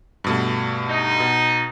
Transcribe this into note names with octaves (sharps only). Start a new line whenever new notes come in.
G2 B2 A3
D#4
B2